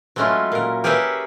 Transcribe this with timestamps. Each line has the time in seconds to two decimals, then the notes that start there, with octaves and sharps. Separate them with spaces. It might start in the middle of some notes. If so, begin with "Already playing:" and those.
0.16 F#3 G#3 A3 C#4 E4 F4
0.52 A#2 A#4
0.84 G4 G#4 A#4 B4 C#5 E5